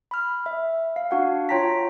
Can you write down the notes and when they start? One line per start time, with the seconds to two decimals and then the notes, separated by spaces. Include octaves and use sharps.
0.11 B5 F6
0.46 E5
0.96 F5
1.11 D4 F#4 F#5
1.49 F4 C#5 G5 A#5 A#6 B6